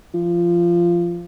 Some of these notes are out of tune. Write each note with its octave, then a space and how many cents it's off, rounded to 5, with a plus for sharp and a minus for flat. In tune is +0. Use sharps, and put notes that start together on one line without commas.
F3 -15